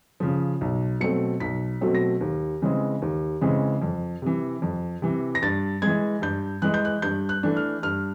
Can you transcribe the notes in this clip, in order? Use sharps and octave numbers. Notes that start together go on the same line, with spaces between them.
C#3 F3
B1
B2 F#3 A3 C4 C#7
B1 B6
B2 F#3 A3 C4
A#6
D#2
C#3 E3 G#3 C4
D#2
C#3 E3 G#3 C4
F2
C3 E3
F2
C3 E3
A#6
G2 A6
E3 G#3 G#6
G2 G6
E3 G#3 F#6
G6
F#6
G2 G6
F#6
E3 A3 D4
F6
G2 F6